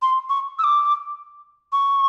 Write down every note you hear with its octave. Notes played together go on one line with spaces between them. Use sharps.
C6
C#6
E6
D6
C#6